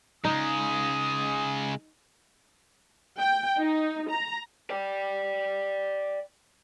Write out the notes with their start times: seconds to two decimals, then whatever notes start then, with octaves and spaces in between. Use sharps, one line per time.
0.25 C#3 G#3 D#4 D#6
3.17 G5
3.59 D#4
4.10 A#5
4.70 D5 G5